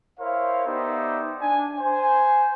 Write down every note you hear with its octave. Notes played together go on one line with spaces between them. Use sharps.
E4 A#4 C5 C#5 F5
B3 D#4 G4 C5 D5 E5
D4 G#5
C5 G#5